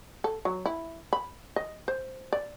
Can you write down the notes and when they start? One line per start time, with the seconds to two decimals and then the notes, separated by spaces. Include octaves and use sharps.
0.24 A4
0.45 F#3
0.66 E4
1.13 B5
1.56 D#5
1.88 C5
2.33 D5